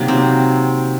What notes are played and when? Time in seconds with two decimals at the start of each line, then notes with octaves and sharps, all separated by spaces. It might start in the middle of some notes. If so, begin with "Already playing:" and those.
Already playing: C3 D#3 F#3 A#3
0.08 C4